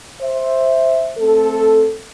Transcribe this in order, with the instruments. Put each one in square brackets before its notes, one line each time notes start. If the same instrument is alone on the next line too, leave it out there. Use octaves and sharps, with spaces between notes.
[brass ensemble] C5 E5
A3 C4 A4